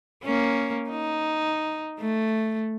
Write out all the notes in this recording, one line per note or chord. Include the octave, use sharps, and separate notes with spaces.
A#3 C#4
D#4
A3